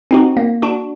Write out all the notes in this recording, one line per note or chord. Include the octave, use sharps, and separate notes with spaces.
C4 D#4 F#4
A#3
D4 F#4